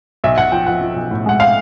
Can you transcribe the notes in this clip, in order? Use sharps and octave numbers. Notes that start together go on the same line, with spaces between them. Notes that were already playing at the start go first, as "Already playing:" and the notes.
B1 E5
B1 F#5
F3 G5
F3 F#5
F3
B1
A2
G#3 F#5
F5